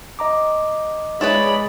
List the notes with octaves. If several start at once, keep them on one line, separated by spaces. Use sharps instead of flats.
D#5 A#5 D6
G#3 E4 G#4 B4 C#5 D5 B5